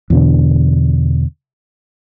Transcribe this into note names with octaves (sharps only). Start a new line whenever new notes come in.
E2 B2 D3